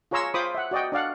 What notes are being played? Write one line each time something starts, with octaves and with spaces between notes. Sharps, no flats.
F4 G#4 C#5 A#5 C6 E6
F4 C5 B5 D6 D#6
E5 F#5
F#4 D5 D#5 G5
D4 D5 F5 F#5